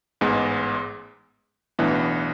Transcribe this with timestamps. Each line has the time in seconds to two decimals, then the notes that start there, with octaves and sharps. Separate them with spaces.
0.21 A1 G#2 G#3 B3
1.79 B1 A2 E3 B3 D4